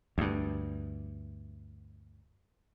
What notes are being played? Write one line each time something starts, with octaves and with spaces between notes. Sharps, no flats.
D2 G2